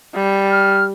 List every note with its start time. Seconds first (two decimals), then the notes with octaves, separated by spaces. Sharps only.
0.14 G3
0.51 F6